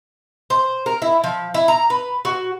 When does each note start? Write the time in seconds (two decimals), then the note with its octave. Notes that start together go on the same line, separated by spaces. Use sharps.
0.50 C5
0.86 A#4
1.02 E4
1.24 F3
1.54 E4
1.68 A#5
1.90 B4
2.25 F#4